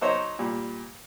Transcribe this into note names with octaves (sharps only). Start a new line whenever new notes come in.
F#3 D#4 C5 C#5
A#2 G3